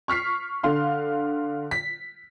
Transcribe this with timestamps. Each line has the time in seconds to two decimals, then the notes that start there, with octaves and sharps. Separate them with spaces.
0.08 C#6 F6 B6 C7
0.63 D3 F5 C6
1.71 B6